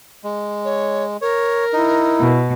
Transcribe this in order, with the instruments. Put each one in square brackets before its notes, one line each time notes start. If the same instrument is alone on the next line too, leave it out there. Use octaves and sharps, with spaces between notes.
[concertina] G#3
[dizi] C#5
[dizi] A#4 [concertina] C#5
[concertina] D#4 [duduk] E4
[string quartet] B2